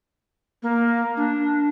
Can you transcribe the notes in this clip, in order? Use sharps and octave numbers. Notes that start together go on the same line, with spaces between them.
A#3
D4